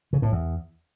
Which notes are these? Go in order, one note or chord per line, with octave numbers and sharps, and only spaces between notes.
C#3
A2
E2